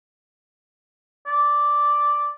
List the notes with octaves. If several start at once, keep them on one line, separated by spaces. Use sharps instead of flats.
D5